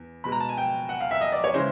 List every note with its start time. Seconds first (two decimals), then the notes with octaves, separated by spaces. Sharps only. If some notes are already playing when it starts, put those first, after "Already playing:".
Already playing: E2
0.24 B2 G#3 B5
0.32 A#5
0.40 A5
0.49 G#5
0.58 G5
0.89 F#5
1.01 F5
1.11 E5
1.21 D#5
1.32 D5
1.44 C#5
1.54 C#3 E3 G#3 C5